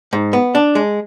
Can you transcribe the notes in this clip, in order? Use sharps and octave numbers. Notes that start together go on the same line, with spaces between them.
G#2
B3
D4
G#3